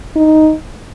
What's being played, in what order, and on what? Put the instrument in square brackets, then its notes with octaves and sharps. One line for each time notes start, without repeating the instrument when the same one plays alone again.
[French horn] D#4